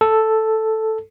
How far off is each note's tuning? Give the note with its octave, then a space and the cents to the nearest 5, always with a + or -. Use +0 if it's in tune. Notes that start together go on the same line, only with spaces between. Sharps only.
A4 +0